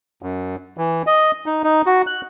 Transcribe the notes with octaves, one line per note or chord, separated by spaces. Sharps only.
F#2
E3
D#5
D#4
D#4
F#4
F#6